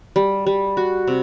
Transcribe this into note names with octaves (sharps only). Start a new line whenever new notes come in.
G3
G3
F#4
C3